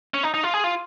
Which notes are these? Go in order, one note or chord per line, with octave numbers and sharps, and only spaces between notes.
C#4
D#4
D#4
F4
G#4
F4